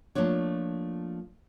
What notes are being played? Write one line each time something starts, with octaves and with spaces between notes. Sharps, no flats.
F3 A3 A#3 D4 C#5